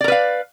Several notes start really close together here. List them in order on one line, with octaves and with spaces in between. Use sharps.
D5 A#4 B4 F5